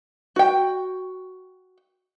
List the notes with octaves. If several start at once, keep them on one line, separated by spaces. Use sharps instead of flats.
F#4 G5